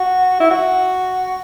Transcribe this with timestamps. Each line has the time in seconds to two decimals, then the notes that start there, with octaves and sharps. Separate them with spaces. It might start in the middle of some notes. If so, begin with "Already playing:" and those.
Already playing: F#4
0.40 E4
0.50 F#4